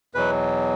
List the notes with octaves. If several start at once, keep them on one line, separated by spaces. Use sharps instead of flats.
E2 B2 F#3 B4